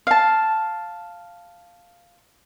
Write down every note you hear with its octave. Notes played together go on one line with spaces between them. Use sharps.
F5 A5